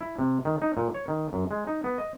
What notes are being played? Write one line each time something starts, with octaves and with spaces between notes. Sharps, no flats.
E4
C3
D#3
D#4
A#2
C#5
D#3
F#2
G#3
D#4
B3
D#5